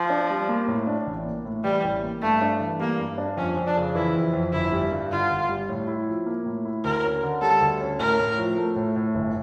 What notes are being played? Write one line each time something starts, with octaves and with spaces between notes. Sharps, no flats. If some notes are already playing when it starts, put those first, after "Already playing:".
Already playing: F3
D4
G3
A#3
A2
D4
A1
A#3
A2
E3 G3
A1
A#3
G2 A3
D4
E3
G3 A#3
G2
D4
F2 C#4
F2
D4
C#3
E3 E4
F2
F2
G1 E4
G3
G2
D3 F4
G1
G3
A2
E4
F3
A#3
A2
E4
D2 A#4
C#4
D3
G3 A4
D2
C#4
A2 A#4
A2
F3
A3
A2
A2
G1